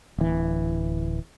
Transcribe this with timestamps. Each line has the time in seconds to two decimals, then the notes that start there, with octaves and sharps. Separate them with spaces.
0.18 D1 E3